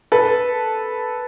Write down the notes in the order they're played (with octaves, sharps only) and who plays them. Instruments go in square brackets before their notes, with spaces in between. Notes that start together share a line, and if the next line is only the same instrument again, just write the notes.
[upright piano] A4 B4